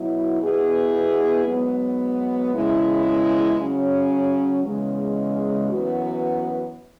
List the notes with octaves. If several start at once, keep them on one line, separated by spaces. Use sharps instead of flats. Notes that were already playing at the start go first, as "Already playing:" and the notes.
Already playing: B2 F#3 E4
B2 B3 E4 G#4
G#2 F#3 B3
E2 C#3 G#3 E4 G#4
C#3 F#3 C#4
E2 C#3 G#3
F#2 E3 B3 F#4